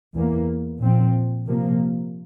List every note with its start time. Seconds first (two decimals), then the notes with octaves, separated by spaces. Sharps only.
0.14 E2 E3 A#3
0.80 A#2 F3 C4
1.46 C3 F3 A#3